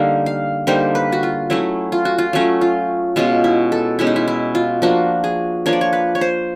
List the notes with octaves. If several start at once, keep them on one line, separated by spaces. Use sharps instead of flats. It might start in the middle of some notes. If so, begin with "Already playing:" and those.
Already playing: D3 G3 A#3 D#4 F5
F5
D3 G3 A#3 D#4 C5
B4
F#4
F4
F#3 A3 C#4 E4
F4
F#4
F4
F#3 A3 C#4
F4
B2 G#3 C#4 F4
E4
A4
B2 G#3 C#4 E4
D#4
E4
E4
F4
F3 A#3 D4 F#4
G#4
F3 A#3 D4 C#5
D5
C#5
B4
C#5
C5